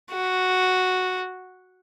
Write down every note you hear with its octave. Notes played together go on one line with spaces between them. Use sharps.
F#4